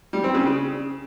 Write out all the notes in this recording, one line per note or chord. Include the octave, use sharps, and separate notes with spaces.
G3
C4
C#3